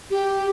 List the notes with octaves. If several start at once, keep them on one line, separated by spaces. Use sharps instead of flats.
G4